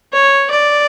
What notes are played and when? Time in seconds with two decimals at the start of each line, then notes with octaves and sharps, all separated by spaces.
0.13 C#5
0.50 D5